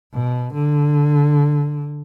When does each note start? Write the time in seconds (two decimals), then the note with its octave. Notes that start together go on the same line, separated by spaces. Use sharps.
0.13 B2
0.54 D3